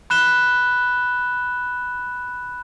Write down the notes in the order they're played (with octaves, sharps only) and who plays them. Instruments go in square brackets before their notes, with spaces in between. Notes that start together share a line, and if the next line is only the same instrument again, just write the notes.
[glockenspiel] B5 F#6 E7 G7